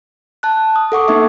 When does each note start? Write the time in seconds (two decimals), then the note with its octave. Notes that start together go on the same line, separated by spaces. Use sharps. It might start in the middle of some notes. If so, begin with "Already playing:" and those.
0.43 A5 F#6
0.76 D#6
0.92 A4 F#5 C#6 D6
1.08 A#3 B3 D#4 A4 E5